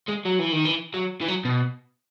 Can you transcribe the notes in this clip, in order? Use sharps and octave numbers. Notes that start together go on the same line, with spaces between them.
G#3
F#3
E3
D#3
E3
F#3
E3
F#3
B2